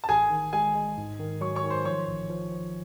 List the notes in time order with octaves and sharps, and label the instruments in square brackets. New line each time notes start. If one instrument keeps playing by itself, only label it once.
[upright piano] A5
[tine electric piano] A1 [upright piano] G#4 G#5
[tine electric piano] D#3
[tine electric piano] G#3 [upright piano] G#4 G#5
[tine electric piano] G#3
G#2
D#3
[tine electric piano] F#3 [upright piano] C#5 C#6
[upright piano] C#5 C#6
[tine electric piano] D#3
[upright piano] C5 C6
[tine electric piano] F3 [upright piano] C#5 C#6
[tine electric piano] A1
F3
F3